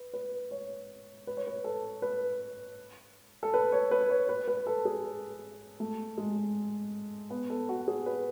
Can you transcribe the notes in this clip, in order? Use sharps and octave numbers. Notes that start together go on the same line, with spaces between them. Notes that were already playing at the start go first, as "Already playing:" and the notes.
Already playing: B4
B4
C#5
B4
C#5
B4
A4
B4
A4
B4
C#5
B4
C#5
B4
B4
A4
G#4
A3
G#3
B3
A4
F#4
G#4
B4